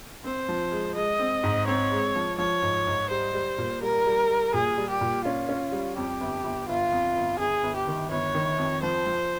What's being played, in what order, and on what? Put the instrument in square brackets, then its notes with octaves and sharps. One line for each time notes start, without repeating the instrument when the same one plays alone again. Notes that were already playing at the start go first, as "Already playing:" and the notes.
[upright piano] C4 [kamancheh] C5
[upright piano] F3
G#3
[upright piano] G#3 [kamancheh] D#5
[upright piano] C4
G#2
[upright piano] C4 [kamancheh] C#5
[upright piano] G#3
F3
[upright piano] F3 [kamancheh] C#5
[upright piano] G#2
G#2
[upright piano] G3 [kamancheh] C5
[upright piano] G3
A#2
[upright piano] G3 [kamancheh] A#4
[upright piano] G3
G3
[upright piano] A#2 [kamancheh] G#4
[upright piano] G3
[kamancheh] G4
[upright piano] A#2
[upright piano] C#4 [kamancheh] F4
[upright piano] C#4
G3
[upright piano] F2 [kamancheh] G4
[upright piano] G1
G1
[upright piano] G1 [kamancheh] F4
[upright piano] F2
G1
[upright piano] G1 [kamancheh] G#4
[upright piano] G1
[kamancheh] G4
[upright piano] D#3
[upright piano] G1 [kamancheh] C#5
[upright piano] D#3
F2
[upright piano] F3 [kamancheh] C5
[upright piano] F3